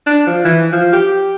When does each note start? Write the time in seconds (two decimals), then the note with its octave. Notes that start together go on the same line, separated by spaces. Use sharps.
0.06 D4
0.27 F3
0.45 E3
0.72 F3
0.93 G4